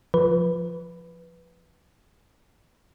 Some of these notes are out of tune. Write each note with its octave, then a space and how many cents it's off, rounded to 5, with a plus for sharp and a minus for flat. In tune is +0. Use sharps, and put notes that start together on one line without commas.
F3 +0 B4 +0